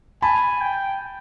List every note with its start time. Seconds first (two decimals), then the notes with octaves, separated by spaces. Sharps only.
0.22 G#5 A5 B5
0.61 G5